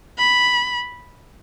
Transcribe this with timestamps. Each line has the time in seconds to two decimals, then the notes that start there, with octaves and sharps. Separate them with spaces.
0.18 B5